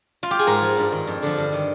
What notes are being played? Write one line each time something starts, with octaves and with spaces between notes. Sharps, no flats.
F4
G4
G#4
G#2 A#4
F3
G2
D#3
F2
D3 F3
G2
D#3